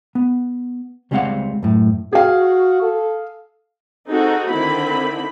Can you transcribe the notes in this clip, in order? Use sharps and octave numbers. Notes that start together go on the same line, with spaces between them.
B3
C#2 G3 G#3 C4 F5 F#5
F#2 A2
F#4 G#4 F5
A4
C4 D#4 F#4 G#4 A4
D3 D#3 C4 E4 B5